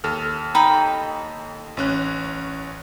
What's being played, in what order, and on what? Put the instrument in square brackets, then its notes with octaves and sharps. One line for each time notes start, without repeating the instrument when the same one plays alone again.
[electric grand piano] D#2 A4 F6
[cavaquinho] D#4 G5 B5
[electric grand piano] A1 C#4 F#6